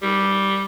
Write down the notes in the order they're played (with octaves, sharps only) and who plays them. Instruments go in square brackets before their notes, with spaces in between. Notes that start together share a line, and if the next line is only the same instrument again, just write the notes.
[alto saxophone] G3